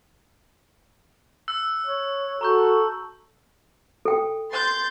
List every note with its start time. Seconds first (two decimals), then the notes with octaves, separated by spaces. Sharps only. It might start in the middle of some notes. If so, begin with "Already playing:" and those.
1.48 E6 F#6
1.86 C#5
2.41 F#4 A4 A#5 C#6 G6
4.05 A4 G5
4.52 C6 G6 A6